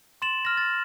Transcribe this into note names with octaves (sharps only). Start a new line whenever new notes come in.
C6 A6 E7 F#7
F6 A#6
A6